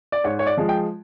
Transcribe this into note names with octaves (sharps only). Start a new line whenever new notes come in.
D5
G#2 C#5
C#5
D5
F3 G#3
G5